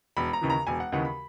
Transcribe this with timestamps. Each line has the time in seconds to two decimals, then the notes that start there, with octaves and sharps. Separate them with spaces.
0.17 E1 B5
0.33 A#5
0.41 D#2 C#3 E3
0.50 A#5
0.67 E1 G#5
0.80 F#5
0.92 D#2 C#3 E3 F#5
1.05 B5